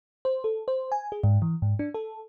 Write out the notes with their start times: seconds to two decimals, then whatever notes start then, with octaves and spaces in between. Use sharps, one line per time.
0.25 C5
0.44 A4
0.68 C5
0.92 G#5
1.12 G#4
1.24 G#2
1.42 E3
1.62 G#2
1.79 D4
1.94 A4